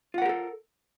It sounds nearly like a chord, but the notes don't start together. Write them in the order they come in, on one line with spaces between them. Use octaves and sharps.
F4 F#5 A#4 G4 A4